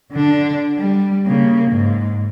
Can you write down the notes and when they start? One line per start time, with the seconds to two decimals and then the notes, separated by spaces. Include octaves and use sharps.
0.11 D3 D4
0.78 G3
1.26 C#3 A#3
1.71 G#2